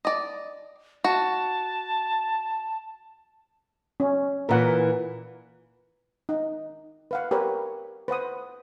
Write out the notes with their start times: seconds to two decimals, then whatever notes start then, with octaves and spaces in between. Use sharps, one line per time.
0.05 D5 D#5
1.04 F#4 A5
4.00 C#4
4.49 A#2 E3 A#4 F#5
6.29 D#4
7.11 B4 F5 F#5
7.31 G4 A#4 B4 C#5
8.08 B4 C5 F#5 D#6